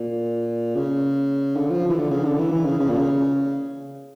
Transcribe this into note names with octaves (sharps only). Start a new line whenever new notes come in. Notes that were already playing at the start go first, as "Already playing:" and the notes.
Already playing: A#2
C#3
D3
F3
E3
D3
C#3
D3
E3
E3
C#3
C#3
A#2
C#3